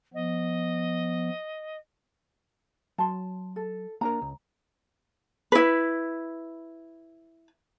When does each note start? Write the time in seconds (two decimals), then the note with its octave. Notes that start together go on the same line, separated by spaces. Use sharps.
0.14 F3 B3 D#5
2.98 F#3 A5 C6
3.56 A4
4.01 A#3 D4 A#4 A#5
4.22 C#2
5.52 E4 B4